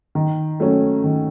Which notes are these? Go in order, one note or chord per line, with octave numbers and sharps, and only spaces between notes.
D#3
F#3 A3 C#4
D#3